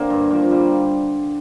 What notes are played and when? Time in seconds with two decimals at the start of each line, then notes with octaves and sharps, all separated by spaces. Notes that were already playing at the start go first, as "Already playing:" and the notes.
Already playing: D3 A#3 C4
0.10 G2
0.31 F3 A#3
0.51 G3